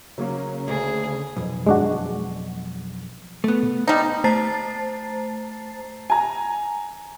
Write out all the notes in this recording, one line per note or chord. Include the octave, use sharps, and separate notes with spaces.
C#3 F#3 A#3 C#4
D2 G#4
B1 F2
G#3 D4 F#4
A3 B3
G3 D#4
A3 C5 A5 A#5 A6 C7
G#5 A#5